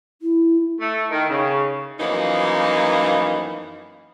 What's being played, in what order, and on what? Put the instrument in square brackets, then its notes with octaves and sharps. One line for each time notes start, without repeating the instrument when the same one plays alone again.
[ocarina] E4
[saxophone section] A3
D#3
C#3
F#2 E3 F3 A#3 B3 D#4